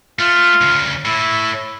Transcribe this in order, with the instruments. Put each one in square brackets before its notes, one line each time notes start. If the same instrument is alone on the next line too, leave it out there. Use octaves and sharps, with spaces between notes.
[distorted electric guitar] A3 [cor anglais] F4
[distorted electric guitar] D2 C#3
[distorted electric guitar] A2 [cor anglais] E4